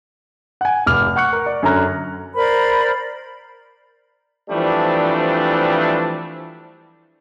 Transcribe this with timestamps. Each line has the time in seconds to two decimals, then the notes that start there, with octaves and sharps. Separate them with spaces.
0.61 F#5 G#5
0.86 F1 D6 F6
1.16 F#5 C#6 F#6 C#7
1.33 A#4
1.46 D5
1.63 F#2 D3 C#5 A#5 F6 F#6
2.34 A#4 C5 D5 B5
4.50 E3 F3 G3 A3 C4 D4